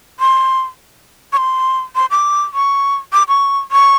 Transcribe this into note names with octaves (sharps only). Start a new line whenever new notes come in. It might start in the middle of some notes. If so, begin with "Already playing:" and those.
C6
C#6
C6
C6
D6
C#6
D6
C#6
C#6